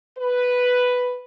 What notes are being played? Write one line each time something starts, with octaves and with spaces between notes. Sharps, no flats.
B4